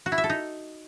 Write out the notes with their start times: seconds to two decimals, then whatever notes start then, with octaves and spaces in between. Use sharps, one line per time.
0.06 F#4
0.12 E4
0.18 E5
0.24 A4
0.30 D#4